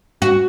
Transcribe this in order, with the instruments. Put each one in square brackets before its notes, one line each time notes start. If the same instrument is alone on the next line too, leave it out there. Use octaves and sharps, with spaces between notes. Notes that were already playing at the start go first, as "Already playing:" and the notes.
[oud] F#4